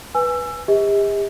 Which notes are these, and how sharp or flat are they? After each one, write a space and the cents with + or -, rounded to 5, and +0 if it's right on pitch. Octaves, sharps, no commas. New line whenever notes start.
B4 -10 G#5 +0 E6 +25
G4 +45 D#5 +45